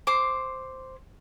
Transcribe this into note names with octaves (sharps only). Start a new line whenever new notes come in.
C5 C6 D6